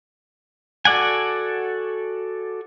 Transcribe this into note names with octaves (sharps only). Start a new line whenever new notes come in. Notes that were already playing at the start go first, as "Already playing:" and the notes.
F#4 A4 D5 F#5 G#5